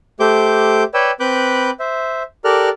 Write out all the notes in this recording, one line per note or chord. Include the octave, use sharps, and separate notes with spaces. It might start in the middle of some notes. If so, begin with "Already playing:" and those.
A3 G4 C5 D6 G6
B4 C#5 D5 G5 E6
C4 B4 B5 D6 F#6 G6
C5 E5
G4 A4 A#4 D5 F6 F#6